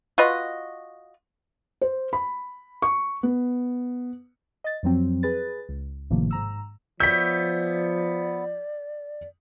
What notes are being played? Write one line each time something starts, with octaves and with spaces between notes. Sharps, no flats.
F4 F#4 B4 D#5
C5
B5
C#6
B3
D#5 A6
F2 F3 F#3 C4
G#4 B4 A6
C#2
G#1 A2 C3 D#3 F3 A#3
G#2 A#5 E6
F3 B3 C#5 D5 E5 G6 B6